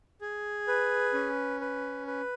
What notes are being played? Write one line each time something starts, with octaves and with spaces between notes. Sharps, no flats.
G#4
B4
C#4
B4
B4